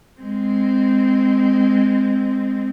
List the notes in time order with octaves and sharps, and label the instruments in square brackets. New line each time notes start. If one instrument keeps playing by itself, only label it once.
[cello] G#3 C4